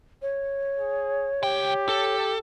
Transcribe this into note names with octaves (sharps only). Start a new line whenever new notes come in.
C#5
G#4
C#2 G4 G5
A4